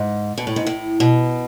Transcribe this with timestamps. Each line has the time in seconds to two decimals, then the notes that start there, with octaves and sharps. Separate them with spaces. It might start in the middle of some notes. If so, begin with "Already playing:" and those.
Already playing: G#2
0.38 B2
0.47 A2
0.56 G#2
0.67 A2
1.00 B2